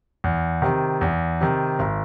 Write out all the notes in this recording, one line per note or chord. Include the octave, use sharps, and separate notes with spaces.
E2
C3 D#3
E2
C3 D#3
G#1